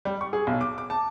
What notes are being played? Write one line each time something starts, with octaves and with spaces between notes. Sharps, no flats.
G3
C#6
G#4
B1
D6
D6
A5